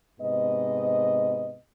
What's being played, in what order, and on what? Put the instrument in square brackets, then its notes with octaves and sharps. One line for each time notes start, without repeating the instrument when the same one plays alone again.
[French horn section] G#2 C3 B3 D#5